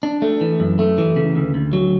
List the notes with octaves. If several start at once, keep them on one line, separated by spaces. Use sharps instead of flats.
D4
A3
E3
F#2
A3
E3
C#3
D2
D2
F#3